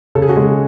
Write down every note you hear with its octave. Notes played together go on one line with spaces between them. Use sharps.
C#3 A4
G#4
F#4
C#3 G#3 G#4